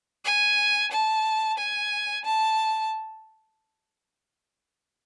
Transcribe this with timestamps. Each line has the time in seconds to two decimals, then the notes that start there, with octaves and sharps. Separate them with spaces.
0.25 G#5
0.91 A5
1.58 G#5
2.24 A5